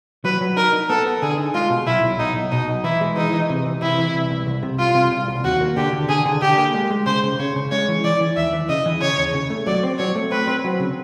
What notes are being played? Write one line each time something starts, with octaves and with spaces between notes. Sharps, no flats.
F#3 B4
F#3
D#4 A#4
D#4
B3 A4
B3
D3 G#4
D#4
G#3 F4
B2
B1 E4
B1
B1 D#4
B1
B2 D#4
B1
E3 E4
G#3
E3 D#4
E3
C3
E3
C3 E4
E3
C2
C2
C2
C3
C2 F4
C3
C2
C2
D#2 F#4
A#3
D3 G4
D3
D3 G#4
D3
D3 G4
A#3
G#3
G#3
C#3 C5
C#3
C#3 C#5
C#3
G#3 C#5
E3
E3 D5
E3
D#2 E5
E3
C#3 D#5
E3
C#3 C#5
D#2
C#3
A3
F#3 D5
C4
F#3 C#5
A3
C4 B4
C4
F#3
C#3